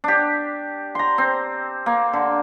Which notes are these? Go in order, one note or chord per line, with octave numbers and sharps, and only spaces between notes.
D4 G4
A#5 C6
C4
A#3
D3